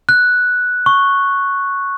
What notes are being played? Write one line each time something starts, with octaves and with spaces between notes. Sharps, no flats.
F#6
C#6